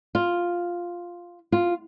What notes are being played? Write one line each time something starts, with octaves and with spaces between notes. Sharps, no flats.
F4
F4